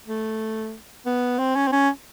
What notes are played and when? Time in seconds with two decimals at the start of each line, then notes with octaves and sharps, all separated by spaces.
0.07 A3
1.06 B3
1.39 C4
1.55 C#4
1.67 C4
1.72 C#4